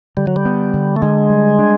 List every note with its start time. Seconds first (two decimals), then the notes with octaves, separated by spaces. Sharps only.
0.17 D3 G3
0.27 F#3
0.36 G3
0.45 B3
0.74 D3
0.96 A3
1.02 D3 G#3
1.30 G3
1.59 D4